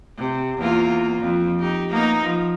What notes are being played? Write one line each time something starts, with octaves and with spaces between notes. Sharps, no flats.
C3
E2 A#3 F4
F2
D#4 G4
A#3 B3 D#4
F3